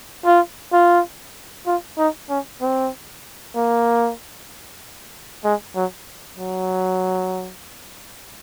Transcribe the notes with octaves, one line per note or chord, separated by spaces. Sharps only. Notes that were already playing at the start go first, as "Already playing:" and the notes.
F4
F4
F4
D#4
C#4
C4
A#3
G#3
F#3
F#3